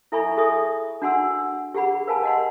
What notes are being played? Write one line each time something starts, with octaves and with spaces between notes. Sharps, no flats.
E4 A4 E5 G#5 B5 C#6
G#4 A4 E5 G#5 C#6 D#6
D4 F#4 F#5 G#5 C6 E6
G4 G#4 F#5 B5
A#4 B4 F5 G#5 A5 B5
D#5 F#5 C6